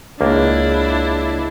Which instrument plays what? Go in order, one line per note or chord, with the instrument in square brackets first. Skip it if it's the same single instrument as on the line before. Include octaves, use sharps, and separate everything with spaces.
[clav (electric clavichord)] C#2 A#3 [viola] D4 E4